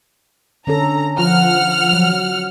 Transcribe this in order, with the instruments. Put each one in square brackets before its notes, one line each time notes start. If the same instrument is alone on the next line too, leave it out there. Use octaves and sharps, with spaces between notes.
[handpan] D3 C#4 A4 [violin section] A#5
[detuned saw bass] F3 [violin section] F#5 F6
[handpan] F#3